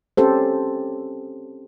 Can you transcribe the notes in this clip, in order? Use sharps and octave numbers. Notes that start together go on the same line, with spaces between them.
C4 C#4 G4 A4 C5